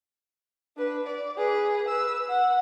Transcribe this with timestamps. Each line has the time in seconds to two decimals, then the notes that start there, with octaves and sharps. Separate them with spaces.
0.77 D4 B4
1.07 D5
1.38 G#4 B4
1.88 B4 E6
2.29 F#5